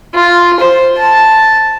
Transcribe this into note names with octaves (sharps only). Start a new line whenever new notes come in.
F4
C5
A5